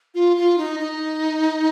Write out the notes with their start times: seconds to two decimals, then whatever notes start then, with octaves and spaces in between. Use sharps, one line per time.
0.15 F4
0.37 F4
0.58 D#4
0.80 D#4